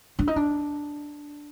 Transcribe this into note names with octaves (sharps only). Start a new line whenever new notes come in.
D4
D#4
D4